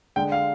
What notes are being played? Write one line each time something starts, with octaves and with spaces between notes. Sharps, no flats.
D3 G#3 D4 G5
F5